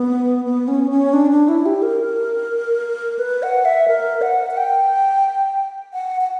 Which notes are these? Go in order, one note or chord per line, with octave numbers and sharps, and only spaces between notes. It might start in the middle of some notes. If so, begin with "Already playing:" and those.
Already playing: B3
B3
C#4
C#4
D4
D4
E4
G4
A#4
B4
F#5
E5
A#4
F#5
F#5
G5
F#5
F#5